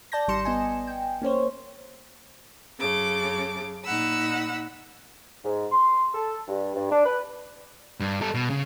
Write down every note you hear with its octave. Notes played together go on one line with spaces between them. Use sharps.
D5 A5 G6 A#6
G#1 G3 C6 C#7 E7
B3 D#5 G#5
G5
A#3 C#4 C5 C#5
F#2 C#3 A4 D6
A#2 D#4 F#5 B5 E6
G#2
C6
A4
G2
G2
D4
B4
G2
G3 A4
B2
C#3